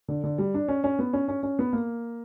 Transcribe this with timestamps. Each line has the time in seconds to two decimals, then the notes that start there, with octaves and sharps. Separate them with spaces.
0.08 D3
0.24 D3
0.38 G3
0.54 D4
0.68 C#4
0.84 C#4
0.99 B3
1.13 C#4
1.28 C#4
1.43 C#4
1.59 B3
1.73 A#3